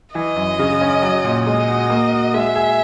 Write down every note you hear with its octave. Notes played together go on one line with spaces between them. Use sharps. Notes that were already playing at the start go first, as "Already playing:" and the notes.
E3 D#5
F#2
C#3
C#4
F#3
A#2
G#3 D#5
F#4
A#3
F#4
G#3 E5
G#4